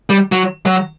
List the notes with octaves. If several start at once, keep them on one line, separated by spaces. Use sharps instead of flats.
G3
F#3
F#3